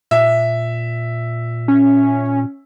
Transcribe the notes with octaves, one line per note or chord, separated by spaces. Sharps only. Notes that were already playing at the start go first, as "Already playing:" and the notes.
A#2 E5
C#4